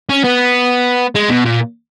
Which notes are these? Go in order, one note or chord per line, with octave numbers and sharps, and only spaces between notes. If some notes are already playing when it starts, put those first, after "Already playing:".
C#4
B3
G#3
B2
A#2